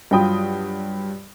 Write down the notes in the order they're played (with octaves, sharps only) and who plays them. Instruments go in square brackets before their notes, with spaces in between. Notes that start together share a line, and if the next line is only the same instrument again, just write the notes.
[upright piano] G2 F#3 F4 G5 B5 D#6